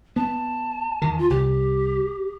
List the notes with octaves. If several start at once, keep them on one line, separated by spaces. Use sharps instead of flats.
B3 A5
E2 D#3
F4
C2 G4